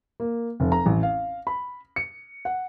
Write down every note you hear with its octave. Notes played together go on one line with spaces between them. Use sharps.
A#3
F1
A#5
A1
F5
B5
C#7
F#5